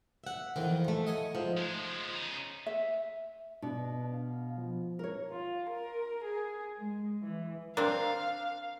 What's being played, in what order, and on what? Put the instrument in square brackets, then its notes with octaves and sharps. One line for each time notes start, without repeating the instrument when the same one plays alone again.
[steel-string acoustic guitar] E5 F#5
[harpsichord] F2 E3 C4 [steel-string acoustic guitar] D#3
[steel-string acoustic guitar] F3 A3
[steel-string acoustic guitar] A3 [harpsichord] D#5 F#5 G#5
[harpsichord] G#2 [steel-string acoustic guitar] F3
[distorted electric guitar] F3 G#3
C#3 D#4
[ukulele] E5
[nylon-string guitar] B2 [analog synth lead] D4
[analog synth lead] F5
F3
[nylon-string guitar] A#4 C#5
[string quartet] F4
A#4
G#4
G#3
E3
[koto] C4 D4 [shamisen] A#4 [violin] F5